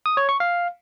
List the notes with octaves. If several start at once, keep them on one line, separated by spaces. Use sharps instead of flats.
D#6
C#5
C#6
F5